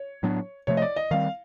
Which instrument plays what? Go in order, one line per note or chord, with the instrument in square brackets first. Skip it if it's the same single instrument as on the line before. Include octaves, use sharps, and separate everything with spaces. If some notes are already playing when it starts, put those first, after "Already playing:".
Already playing: [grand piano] C#5
[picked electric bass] A2 F#3 B3 D4
[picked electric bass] C3 F3 A3 [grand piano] C#5
[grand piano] D#5
D5
D#5
[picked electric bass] D#3 G3 C4 [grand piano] F5